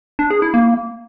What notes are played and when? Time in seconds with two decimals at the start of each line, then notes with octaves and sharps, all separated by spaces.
0.19 D4
0.30 G#4
0.42 E4
0.54 A#3